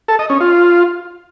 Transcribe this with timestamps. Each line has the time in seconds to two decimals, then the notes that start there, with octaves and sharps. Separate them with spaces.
0.08 A4
0.19 D#5
0.30 C#4
0.40 F4